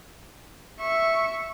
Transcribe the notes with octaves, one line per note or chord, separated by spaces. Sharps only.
E5 C#6